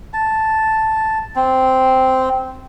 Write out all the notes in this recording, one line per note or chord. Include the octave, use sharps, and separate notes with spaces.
A5
C4